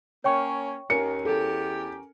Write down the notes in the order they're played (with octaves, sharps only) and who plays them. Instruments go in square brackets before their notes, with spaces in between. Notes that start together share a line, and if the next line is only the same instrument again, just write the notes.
[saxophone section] A#3 C#4 [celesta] C#5 G5 C#6
[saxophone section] D#2 [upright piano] C#4 A#4 G#5 [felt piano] C#7
[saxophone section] E2 G4 [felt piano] A4